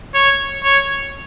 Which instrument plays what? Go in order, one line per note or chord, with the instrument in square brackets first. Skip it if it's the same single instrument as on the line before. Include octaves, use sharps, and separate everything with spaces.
[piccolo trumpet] C#5
C#5